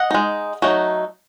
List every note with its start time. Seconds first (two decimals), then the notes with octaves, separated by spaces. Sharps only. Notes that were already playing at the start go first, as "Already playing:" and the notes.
Already playing: D#5 F#5
0.11 G#3 D#4
0.62 F#3 A3 D#4